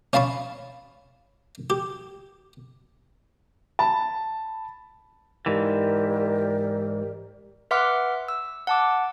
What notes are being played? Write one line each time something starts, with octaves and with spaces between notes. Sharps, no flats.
C#4 F5 A5 B5 C#6
G4
A5 B5
G#2 E3 G4 A#4 D5
B4 E5 F#5 C6 D6 F6
E6
F#5 A5 D6